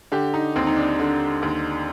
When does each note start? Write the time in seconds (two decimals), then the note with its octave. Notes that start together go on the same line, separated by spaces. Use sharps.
0.12 D3 G4
0.34 D#4
0.56 D#2 C4
0.67 D#4
0.77 D4
1.00 D3
1.42 D#2